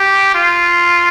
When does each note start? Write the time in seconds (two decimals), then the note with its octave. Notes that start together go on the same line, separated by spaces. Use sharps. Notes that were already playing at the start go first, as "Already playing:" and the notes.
Already playing: G4
0.34 F4